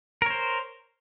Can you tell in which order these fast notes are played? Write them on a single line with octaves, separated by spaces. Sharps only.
A#4 C#5 C5